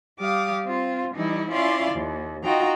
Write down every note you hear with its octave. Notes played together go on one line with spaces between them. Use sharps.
G3 G4 F5 D6 D#6
C4 F4
E3 G3 D#4 E4
C#4 E4 F4 D5 F5 C6
D#2
D#4 F4 F#4 D#5 G5 A#5